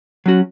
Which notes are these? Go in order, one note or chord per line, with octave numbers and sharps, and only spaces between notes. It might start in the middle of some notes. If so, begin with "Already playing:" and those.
F#3 C#4 F#4